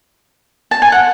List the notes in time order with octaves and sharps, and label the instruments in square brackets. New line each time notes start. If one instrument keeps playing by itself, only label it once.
[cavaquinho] A5
G#5
F#5